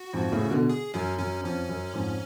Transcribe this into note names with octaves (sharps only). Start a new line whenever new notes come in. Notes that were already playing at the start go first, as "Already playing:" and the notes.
Already playing: F#4
F2 G#2
A2 C#3
B2 D3
G#4
F#2 C#4
F#2 C#4
F2 C#4
F#2
F2 G#2